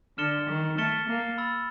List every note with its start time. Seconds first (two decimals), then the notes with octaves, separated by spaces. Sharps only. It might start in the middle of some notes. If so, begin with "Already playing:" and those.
0.17 D3 F6 A6 C#7 E7 G7
0.49 D#3
0.77 A3 F6 A6 C#7 E7 G7
1.08 A#3
1.38 B5 E6 A6